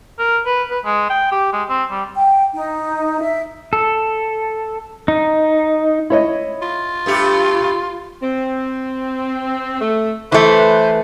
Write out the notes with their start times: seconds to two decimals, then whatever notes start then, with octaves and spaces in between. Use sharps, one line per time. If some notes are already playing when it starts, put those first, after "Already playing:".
0.19 A#4
0.46 B4
0.70 B4
0.85 G#3
1.10 G5
1.32 G4
1.53 G#3
1.69 C4
1.91 G3
2.15 G5
2.53 D#4
3.20 E5
3.73 A4
5.08 D#4
6.10 E4 C#5 D#5
6.62 F4
7.06 G2 A3 G4
8.22 C4
9.81 A3
10.32 E3 A3 B4 C5